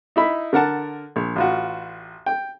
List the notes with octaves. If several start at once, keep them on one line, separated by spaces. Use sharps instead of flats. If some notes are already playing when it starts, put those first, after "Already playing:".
D#4 E4 B5
D3 A#4 F#5 A5
A#1
A1 F4 F#4
G5